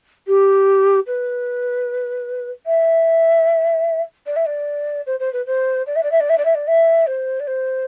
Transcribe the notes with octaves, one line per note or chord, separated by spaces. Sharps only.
G4
B4
E5
D5
E5
D5
C5
C5
B4
C5
D5
E5
D5
E5
D5
E5
D5
E5
D5
E5
C5
D5
C5